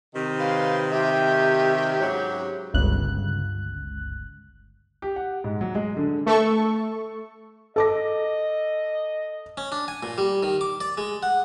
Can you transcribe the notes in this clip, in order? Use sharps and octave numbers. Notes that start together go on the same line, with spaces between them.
C3 D#3
B4 F5 C6
G4 E5
G#2 C#3 F#3
G1 C#2 F#6
G4
F#5
G#2
F#3
G#3
D3
A3 A4 C#6
A4 D#5 D6 A#6
C#4
D4
G#5
A#2
G3
D#3
D6
D5
G#3
F#5